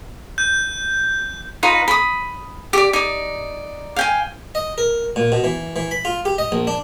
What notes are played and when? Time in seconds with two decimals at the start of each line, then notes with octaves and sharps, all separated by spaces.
0.38 G6
1.63 D#4 F4 B4 A#5
1.88 B5 D#6
2.73 G4 D5
2.93 D#4 D5
3.96 F5 G5 G#5
4.55 D#5
4.78 A#4
5.16 A#2
5.32 B2
5.44 E3
5.76 E3
5.91 B5
6.05 F4
6.25 G4
6.38 D#5
6.52 A#1
6.67 D4